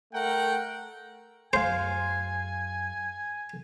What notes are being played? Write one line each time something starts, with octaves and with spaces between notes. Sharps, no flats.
A3 A#4 F#5 G5
F#2 G#4 C5 F5 G#5